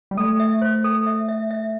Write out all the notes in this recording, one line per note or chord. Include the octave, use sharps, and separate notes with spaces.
G3
A3 A4
E5
C5
A4
E5
E5
E5